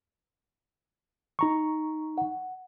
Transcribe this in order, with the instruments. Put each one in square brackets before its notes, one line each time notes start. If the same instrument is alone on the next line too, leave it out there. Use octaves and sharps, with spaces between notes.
[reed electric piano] D#4 A#5 C#6
[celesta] F#5